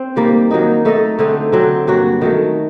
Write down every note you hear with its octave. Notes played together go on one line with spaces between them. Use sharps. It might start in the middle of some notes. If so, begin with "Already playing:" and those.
Already playing: C4
D#3 G3 A#3
D#3 F#3 A#3 D#4
A3 D#4 A4 D#5
D3 A3 C4 D#4
D3 F#3 C4
G2 F#3 A#3 F#4
D#3 F#3 A3